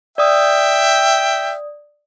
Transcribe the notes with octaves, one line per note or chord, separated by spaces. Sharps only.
D5 E5 G5 D#6